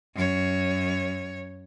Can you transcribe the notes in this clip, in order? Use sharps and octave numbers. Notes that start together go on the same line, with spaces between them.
F#2 C#5